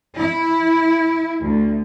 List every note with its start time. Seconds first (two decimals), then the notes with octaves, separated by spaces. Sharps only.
0.19 E4
1.47 D2